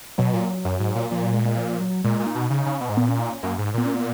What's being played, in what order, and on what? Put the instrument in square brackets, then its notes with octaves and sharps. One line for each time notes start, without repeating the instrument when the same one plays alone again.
[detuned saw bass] B2 [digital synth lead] F#3
[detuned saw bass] A#2
F#2
G#2
A#2
[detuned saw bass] A#2 [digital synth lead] F3
[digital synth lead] F#3
G#3
G#3
F3
F#3
[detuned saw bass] A#2 [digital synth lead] G#3
[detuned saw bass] A#2
[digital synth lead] D#4
[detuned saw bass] B2
[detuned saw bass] C#3 [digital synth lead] D#4
[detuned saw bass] C#3
B2
G#2
[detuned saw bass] A#2 [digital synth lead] B3
[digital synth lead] C#4
D#4
C#4
[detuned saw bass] F#2 [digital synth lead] A#3
[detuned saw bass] G#2
[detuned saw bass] A#2 [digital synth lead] B3
[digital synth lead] C#4
B3